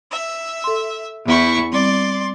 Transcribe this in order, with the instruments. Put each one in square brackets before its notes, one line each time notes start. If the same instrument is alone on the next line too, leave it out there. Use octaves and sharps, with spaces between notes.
[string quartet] E5
[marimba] A4 C6
[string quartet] E2 E4 C#6
[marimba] G3 C4 [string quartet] D5 C6